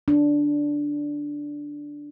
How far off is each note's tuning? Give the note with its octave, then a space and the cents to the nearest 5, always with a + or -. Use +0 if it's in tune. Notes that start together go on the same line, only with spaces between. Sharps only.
D4 -5